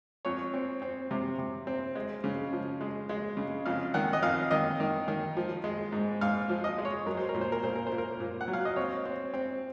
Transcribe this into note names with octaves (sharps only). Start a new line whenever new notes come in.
F2 C#5
C4
C4
C3
C3
C4
G#3
C#3
F3
G#3
G#3
C#3
F2 F5
D#3 F#5
D#5
F2 F5
D#3 D#5
D#3
D#3
F3
G#3
G#2
G#2 F5
F3
D#5
G#3
C#5
F#3 A#4
C5
A#4
A#2
C5
A#4
A#2 C5
A#4
C5
A#2
A#4
A#2
F#5
F#3
F5
D#5
C4 C#5
C4
C4